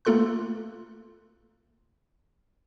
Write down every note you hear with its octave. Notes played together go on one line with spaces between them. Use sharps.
A3 A#3 F4 A4 C6 F#6